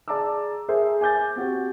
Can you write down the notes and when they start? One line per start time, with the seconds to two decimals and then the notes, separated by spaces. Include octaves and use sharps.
0.08 G#4 D5 A5 A#5 D6 E6
0.69 G#4 A#4 C5 E5
1.01 G#5 D6 G6 A6
1.36 C4 F#4 G4